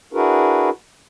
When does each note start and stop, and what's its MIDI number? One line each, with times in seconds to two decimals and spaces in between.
0.13 0.70 62
0.13 0.70 64
0.13 0.70 66
0.13 0.70 68
0.13 0.70 70
0.13 0.70 71